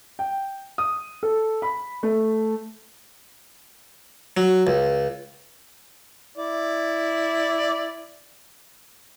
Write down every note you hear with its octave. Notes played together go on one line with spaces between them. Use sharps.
G5
D#6
A4
B5
A3
F#3
C#2
E4 D5